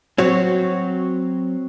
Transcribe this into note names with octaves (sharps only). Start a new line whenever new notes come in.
F#3 C4 F#4 C#5